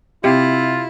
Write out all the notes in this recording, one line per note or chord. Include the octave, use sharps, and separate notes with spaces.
C3 E4 F4 G4